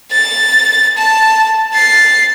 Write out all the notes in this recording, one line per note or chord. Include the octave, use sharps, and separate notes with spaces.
A6
A5
A6 C7